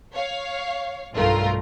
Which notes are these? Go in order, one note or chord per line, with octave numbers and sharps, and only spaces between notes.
C#5 F5
B1 G2 A3 F4 A#4